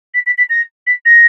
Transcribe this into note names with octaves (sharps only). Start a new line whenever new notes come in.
B6
B6
B6
A#6
B6
A#6